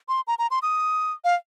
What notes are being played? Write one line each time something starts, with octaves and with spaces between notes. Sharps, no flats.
C6
A#5
A#5
C6
D#6
F5